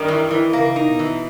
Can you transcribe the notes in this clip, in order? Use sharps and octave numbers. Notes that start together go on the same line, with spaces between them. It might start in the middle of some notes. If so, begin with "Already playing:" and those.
Already playing: G2 D#3 G3
E3
E3
C#3 A#3
D#4
B2
E3